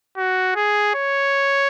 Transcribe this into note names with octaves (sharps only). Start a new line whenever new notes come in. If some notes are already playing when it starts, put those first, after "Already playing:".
F#4
G#4
C#5